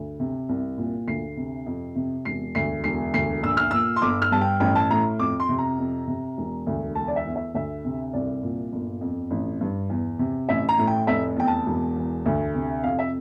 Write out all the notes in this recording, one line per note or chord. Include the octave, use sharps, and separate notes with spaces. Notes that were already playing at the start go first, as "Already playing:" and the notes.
Already playing: D2
C3
C2
A#2
D2 C7
C3
F2
C3
E1 C7
D2 C7
E1 C7
D2 C7
A#1 E6
F6
A#2 E6
C6
G1 D6
F6
G2 A5
G5
A1 G5
A5
A2 A#5
F2 D6
C6
C3
A#5
F2
C3
E1
D2
E1 A5
D5
E5
E2
E5
D2 E5
C3
C2 D5
A#2
G1
F2
A1
G2
E2
C3
A1 E5
A#5
A2
G5
F1 E5
E2 G5
A5
E1
E2
D2
C3
F2 F5
E5